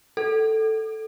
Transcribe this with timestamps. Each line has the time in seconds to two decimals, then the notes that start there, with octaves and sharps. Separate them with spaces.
0.17 A4